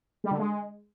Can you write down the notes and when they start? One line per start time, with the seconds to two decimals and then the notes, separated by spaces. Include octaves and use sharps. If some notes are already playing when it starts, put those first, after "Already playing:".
0.24 G3
0.31 D3
0.38 G#3